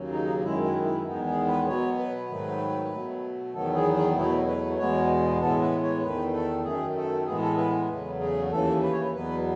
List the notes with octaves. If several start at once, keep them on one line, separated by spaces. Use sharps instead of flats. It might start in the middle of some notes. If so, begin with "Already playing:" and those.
Already playing: D#2 C#3 F#3
D#4
F#2 D#3 G#3 E4
E4
E4
E2 D#3 G#3 B3 D#4
G#4
B4
B2 F#3 B3 C#5
B4
G#2 D#3 F#3 A3
B2 F#3 A3
E2 D#3 F#3 B3 A4
G#4
G#4
E2 B2 F#3 A3 E4
B4
E2 B2 G#3 B3 C#5
A2 E3 G#3 B3 A4
B4
C#5
E2 D#3 A3 B4
A4
F#2 D#3 A3 G#4
A4
A2 E3 G#3 B3 G#4
A4
B4
E2 C#3 F#3 A3 B4
G#4
D#2 C#3 E3 A4
B4
C#5
B4
E2 B2 F#3 B3 B4